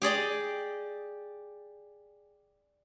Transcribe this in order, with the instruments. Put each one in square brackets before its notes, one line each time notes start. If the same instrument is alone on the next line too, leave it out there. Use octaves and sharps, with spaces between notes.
[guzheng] G4 G#4 D5 D#5